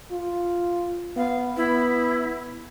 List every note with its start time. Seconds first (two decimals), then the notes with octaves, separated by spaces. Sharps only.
0.11 F4
1.16 B3 F5
1.57 B3 E4